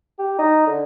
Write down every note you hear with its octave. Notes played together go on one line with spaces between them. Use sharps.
G4
D#4
D3